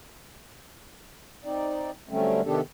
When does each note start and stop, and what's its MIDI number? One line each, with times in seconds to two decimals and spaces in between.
1.44 1.91 60
1.44 1.91 63
1.44 1.91 74
2.09 2.41 50
2.09 2.41 54
2.09 2.41 55
2.09 2.41 57
2.09 2.41 60
2.09 2.41 61
2.45 2.61 48
2.45 2.61 51
2.45 2.61 59
2.45 2.61 62
2.45 2.61 67
2.45 2.61 69